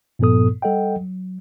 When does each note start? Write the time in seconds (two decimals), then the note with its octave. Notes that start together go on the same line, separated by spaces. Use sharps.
0.19 G2 A#2 F3 B3 A4 D#6
0.62 G3 A4 D#5 F#5 G5
0.97 F#3